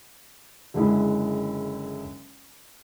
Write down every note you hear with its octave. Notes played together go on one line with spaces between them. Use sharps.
F#1 D3 G#3 E4